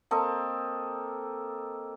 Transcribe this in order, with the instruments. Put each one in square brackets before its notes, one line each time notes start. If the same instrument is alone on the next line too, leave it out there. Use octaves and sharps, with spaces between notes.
[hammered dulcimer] A#3 C4 A4 D#5